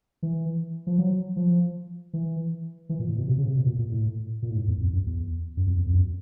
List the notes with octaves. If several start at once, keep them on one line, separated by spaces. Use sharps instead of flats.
E3
F3
F#3
F3
E3
E3
A#2
A2
B2
C3
C#3
C3
B2
A#2
A#2
A2
A#2
A2
G#2
E2
F2
F#2
E2
F#2
F2
E2
F2
F#2